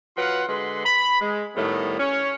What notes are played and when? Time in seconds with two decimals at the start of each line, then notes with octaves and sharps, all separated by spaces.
0.17 F#3 F4 B4 F5 F#5
0.49 D3 G#3 B4 C6
0.86 B5
1.20 G#3
1.56 A2 D#3 G3 A3 B3
1.99 C#4 C#5